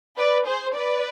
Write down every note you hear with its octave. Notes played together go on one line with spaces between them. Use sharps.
B4 D5
G#4 C5
B4 D5